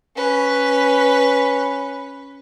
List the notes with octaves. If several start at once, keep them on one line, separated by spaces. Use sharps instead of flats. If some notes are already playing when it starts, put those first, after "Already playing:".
C#4 B4